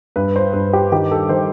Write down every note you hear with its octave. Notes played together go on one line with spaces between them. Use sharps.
G2 B4
C5
G2 B4
G4
D#3 G4
A4
D#3 C5